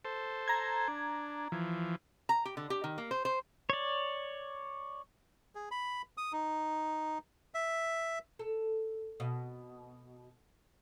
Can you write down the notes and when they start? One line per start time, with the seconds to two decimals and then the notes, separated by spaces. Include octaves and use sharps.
0.05 A4 C5
0.48 A#5 G#6
0.88 D4
1.52 E3 F3
2.29 A#5
2.45 G4
2.57 D3
2.70 G4
2.84 D#3
2.98 A#3
3.11 C5
3.25 C5
3.70 C#5 D5
5.55 G#4
5.71 B5
6.17 D#6
6.32 D#4
7.54 E5
8.39 A4
9.20 B2